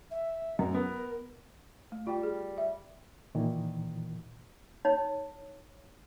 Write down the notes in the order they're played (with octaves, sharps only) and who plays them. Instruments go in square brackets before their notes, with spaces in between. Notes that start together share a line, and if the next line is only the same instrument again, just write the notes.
[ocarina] E5
[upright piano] F#2 [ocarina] A#4
[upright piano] B3
[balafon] A3
[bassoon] G3 [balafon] F4 G5
[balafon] G#4
E5
[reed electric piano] A#2 D#3 E3
[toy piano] D#4 C#5